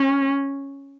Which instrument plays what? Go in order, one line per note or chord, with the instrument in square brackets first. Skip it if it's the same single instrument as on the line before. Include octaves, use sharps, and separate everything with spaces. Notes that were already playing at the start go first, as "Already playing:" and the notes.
Already playing: [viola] C#4